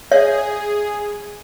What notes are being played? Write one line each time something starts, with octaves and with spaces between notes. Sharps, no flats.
G#4 C#5 E5